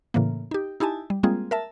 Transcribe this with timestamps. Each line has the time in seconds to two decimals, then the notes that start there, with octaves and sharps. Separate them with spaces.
0.14 A2 C#3 E3 A#3
0.51 D#4 G4
0.80 D#4 E4 G4 G#5 A5
1.10 G3
1.23 G3 G#3 A#3 C4 F4 G#4
1.51 A#4 E5 A5